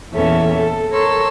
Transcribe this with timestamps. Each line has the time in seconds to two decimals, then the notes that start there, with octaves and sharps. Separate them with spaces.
0.13 E2 A#2 E3 C#4 A4 E5
0.55 A4
0.92 A4 A#4 C#5 C6 C#6 E6